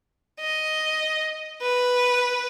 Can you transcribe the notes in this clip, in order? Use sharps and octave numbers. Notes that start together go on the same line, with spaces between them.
D#5
B4